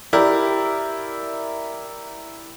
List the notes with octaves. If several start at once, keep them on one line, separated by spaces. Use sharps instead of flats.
E4 G4 A#4 D5